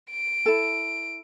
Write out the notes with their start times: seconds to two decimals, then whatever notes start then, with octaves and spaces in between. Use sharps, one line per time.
0.10 D7
0.46 E4 A4